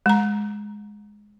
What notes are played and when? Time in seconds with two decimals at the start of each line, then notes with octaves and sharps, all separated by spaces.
0.06 G#3 A#5